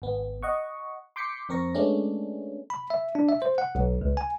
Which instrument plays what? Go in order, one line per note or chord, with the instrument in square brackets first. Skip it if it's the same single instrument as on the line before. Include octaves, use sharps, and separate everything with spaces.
[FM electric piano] G#1 B3
D#5 F#5 C#6
C6 D6 G6 B6 C#7
F2 C4 A#4 C#6 A#6
G#3 A3 B3 C#4 D4
[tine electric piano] B5
E5
D4
E5
C5
F#5
B1
C#2
G#5